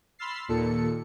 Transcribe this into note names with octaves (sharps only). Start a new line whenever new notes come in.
B5 C6 E6 F6 A6 C7
D#2 A#2 A4 C#7